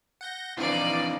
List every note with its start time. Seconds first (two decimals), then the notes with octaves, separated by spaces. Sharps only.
0.21 F#5 G6 A#6
0.57 E3 C4 D4 D#4 F4 D5